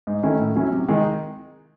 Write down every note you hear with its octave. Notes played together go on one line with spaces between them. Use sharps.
G#2
D#3 A3 C#4 E4
A2
F#3 C#4 E4
C3
D#3 G#3 D#4